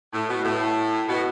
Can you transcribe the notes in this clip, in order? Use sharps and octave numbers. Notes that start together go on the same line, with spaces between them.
A2
B2
A2
B2